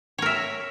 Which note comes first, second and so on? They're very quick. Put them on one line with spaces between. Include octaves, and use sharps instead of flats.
C#5 A#4 E5